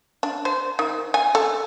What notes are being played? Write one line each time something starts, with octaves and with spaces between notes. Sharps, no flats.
D4
C5
D#3
G#5
A4